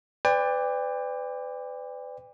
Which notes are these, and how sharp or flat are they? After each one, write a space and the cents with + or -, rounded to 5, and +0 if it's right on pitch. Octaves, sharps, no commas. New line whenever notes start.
B4 +35 D5 +0 G5 +35